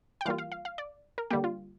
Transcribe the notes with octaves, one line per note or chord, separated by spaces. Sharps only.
G5
E3 G3 A#3 F4 F5
F5
F5
F5
D5
A#4
D3 G3 A#3 G4
F4